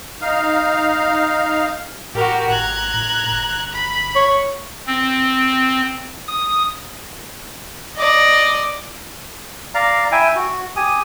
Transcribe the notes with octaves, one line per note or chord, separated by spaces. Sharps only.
D#4 F5
A2 F#4 G4 A#4
G#1 A#5 F#6 G#6
A2
G1
B5
C#5
C4
D#6
D5 D#5
D5 F5 A#5
E4 E5 G5 G#5
F#4
G4 G#5 D#6